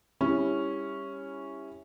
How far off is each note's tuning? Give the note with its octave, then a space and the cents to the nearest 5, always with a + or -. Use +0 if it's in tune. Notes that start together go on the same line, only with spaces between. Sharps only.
G3 +25 C#4 +0 E4 +0